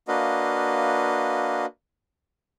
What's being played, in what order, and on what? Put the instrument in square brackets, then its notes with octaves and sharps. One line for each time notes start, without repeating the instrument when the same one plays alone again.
[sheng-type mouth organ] A#3 D4 F#4 B4 D#5 F5